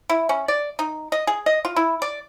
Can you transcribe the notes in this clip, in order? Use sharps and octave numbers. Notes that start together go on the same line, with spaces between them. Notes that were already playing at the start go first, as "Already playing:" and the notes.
E4
C#4
D5
D#4
D#5
G#4
D#5
F4
E4
D5